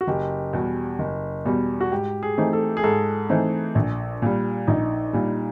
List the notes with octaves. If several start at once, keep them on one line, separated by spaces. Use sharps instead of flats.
F#4
F#1 G4
E2 B2 G3
F#1
E2 B2 G3
F#4
G#2 G4
G#4
E3 A3 C4 D#4
A4
G#4
G#2 A4
E3 A3 C4 D#4
A#1
A#2 G3
A#1 D#4
A#2 G3